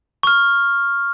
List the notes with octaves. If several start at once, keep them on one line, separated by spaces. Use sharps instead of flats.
C#6 F6